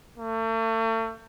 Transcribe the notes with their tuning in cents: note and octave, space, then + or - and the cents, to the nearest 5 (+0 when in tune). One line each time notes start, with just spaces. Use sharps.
A3 +40